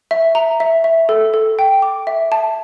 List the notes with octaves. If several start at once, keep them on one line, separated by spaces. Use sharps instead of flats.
E5
A#5
E5
E5
A4
A4
G5
D6
E5
A5